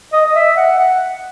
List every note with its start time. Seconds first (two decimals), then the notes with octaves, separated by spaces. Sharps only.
0.13 D#5
0.26 D#5
0.35 E5
0.57 F#5
0.78 F#5